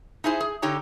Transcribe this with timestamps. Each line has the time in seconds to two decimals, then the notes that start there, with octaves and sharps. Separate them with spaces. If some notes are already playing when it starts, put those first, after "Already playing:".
0.24 D#4 E4 G#4 C5
0.40 G#4
0.62 D3 D#4 G4 C#5 A#5